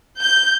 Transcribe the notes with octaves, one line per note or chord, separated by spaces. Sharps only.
G6